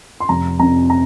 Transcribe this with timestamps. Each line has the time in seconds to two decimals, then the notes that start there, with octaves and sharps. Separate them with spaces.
0.20 C6
0.29 F1 A#5
0.59 F2 C3 A#5
0.90 A#5